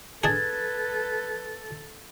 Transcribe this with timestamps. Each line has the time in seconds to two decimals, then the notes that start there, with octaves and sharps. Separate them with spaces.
0.24 D4 G#4 A4 B4 G#6 A6